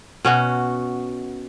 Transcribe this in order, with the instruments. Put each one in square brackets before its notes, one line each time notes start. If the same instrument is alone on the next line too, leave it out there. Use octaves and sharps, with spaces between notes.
[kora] B2 C#4 F#4